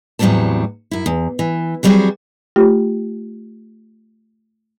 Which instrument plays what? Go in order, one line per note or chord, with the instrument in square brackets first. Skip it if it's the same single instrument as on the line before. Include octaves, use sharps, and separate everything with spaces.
[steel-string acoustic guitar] E2 A2 F#3 G3 C4 A5
F#2 E4
E2
E3
E3 F#3 G3 C4 F#4 G#4
[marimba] A3 F4 G4